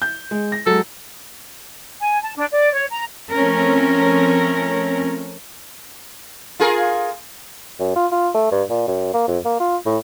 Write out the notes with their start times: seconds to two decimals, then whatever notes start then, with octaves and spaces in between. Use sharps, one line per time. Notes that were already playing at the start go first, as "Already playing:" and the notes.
0.02 G6
0.31 G#3
0.52 A#6
0.66 F#3 G#3 A4
2.01 G#5
2.22 A5
2.36 D4
2.51 D5
2.73 C#5
2.90 A#5
3.31 F3 A3 C4 C#4 A#4
6.60 F4 G#4 A#4
7.79 F#2
7.96 F4
8.12 F4
8.34 A3
8.52 G2
8.70 A#2
8.88 F#2
9.14 A#3
9.28 F2
9.45 A#3
9.60 F4
9.86 A2